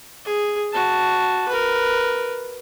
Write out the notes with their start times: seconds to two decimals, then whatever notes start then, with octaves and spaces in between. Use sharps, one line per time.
0.25 G#4
0.72 F#4 A5
1.49 A#4 B4